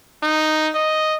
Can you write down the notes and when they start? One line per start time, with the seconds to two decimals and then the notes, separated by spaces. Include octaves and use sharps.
0.23 D#4
0.75 D#5